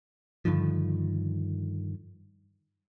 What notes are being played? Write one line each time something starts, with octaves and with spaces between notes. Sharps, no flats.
G2 D3 D#3 F3